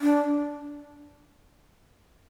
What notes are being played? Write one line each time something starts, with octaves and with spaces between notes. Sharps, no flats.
D4